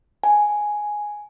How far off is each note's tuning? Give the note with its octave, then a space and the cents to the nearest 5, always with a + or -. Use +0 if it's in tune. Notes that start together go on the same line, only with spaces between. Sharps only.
G#5 +5